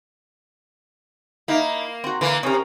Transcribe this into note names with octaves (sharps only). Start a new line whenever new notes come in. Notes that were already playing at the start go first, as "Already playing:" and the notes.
A#3 D#4 E4
C4 F#4
D3 E3 A#3
C3 C#4 A#4